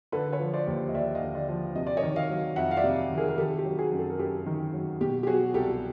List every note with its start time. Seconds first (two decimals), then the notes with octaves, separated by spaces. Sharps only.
0.12 D3 A4 B4
0.33 B4 C#5
0.40 F3
0.53 C5 D5
0.67 D#2
0.89 D#5
0.94 D#2 D5 E5
1.15 D#5 F5
1.21 D3
1.35 D5 E5
1.49 F3
1.76 C3 D#5
1.87 D5
1.97 C#5 D#5
2.02 D#3
2.16 D#5 F5
2.30 F#3
2.56 F2 E5 F#5
2.71 F5
2.77 D5 E5
2.84 C3
3.11 D#3
3.17 G#4 A#4
3.28 A#4
3.37 D#3 G4 A4
3.58 G4
3.65 F#3
3.78 F#4 G#4
3.92 F#2
3.99 A4
4.10 A#4
4.19 F#2 G4 A4
4.46 D#3
4.73 F#3
5.01 B2 G4
5.23 G4
5.27 F#3 F#4 G#4
5.54 C2 G4 A4